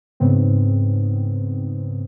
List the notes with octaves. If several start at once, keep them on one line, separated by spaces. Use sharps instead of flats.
G#2 C#3 B3 C4